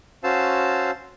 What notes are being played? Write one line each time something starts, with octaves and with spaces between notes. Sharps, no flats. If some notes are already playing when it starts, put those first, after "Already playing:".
C#4 F#4 C5 F5 A5 E6